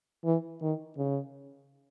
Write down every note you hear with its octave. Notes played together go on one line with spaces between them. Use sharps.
E3
D#3
C#3